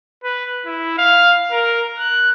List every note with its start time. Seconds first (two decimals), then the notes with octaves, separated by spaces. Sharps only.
0.24 B4
0.65 E4
0.98 F5
1.52 A#4
1.99 F#6